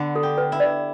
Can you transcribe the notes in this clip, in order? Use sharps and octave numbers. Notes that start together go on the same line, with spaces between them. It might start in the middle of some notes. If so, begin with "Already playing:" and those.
Already playing: D3 B3
A4
G4
B4
E4
D5